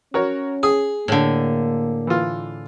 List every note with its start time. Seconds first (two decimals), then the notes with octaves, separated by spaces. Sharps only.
0.14 C#4 F#4 A#4 C#5
0.63 G#4 D#6
1.08 A2 D3 A#3
2.07 E3 F4